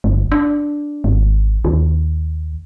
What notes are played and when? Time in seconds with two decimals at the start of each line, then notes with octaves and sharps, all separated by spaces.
0.04 G1
0.32 D4
1.04 G#1
1.65 D#2